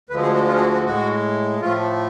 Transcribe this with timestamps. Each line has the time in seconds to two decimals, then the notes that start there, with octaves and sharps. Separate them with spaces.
0.09 D2 D3 F3 G#3 B4
0.22 G#4
0.34 F#4
0.48 F4
0.56 G#4
0.60 F#4
0.73 F#4
0.85 A2 G#3 F#4
1.61 A2 F3 A3 F4